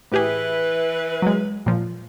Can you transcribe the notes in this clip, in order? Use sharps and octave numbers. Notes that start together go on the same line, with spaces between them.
A2 E3 E4 G4 G#4 B4
F#3 G#3
A#2 F3